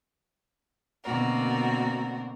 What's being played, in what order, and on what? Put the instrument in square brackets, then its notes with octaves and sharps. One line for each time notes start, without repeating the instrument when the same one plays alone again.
[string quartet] B2 D3 A#3 C4 F#4 A#4